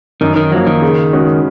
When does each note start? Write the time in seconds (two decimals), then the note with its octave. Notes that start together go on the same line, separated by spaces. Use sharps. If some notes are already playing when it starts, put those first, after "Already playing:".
0.21 F#2 D#3
0.36 D#3
0.51 F3 F#3 A#3
0.67 D#3
0.82 C#3
1.13 G#3 C#4 F#4